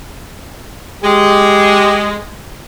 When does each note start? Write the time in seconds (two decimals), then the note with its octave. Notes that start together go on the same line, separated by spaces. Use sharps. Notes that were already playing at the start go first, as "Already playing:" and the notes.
1.04 G#3 G4